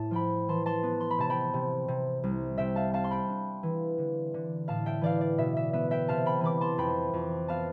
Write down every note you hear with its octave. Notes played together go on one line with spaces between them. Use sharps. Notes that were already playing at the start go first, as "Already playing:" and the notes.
Already playing: A2 A5
F3 G5 B5
E3 A5 C6
A5 C6
B3
C6
B5
C3 A5
G5 B5
C3
C3
C2
C3 E5 G5
F5 A5
C4 F5 A5
C6
G5 B5
D4
E3
D3
D3
A2 F5 A5
E5 G5
E3 D5 F5
D5
B2 E5
E5
B3 E5
E5 G5
C3 F5 A5
G5 B5
E3 B5 D6
A5 C6
F2 G5 B5
F2
B3 F5 A5